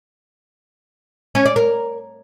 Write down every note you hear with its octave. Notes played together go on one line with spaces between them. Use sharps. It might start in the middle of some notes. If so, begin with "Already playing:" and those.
C#4
D5
A#4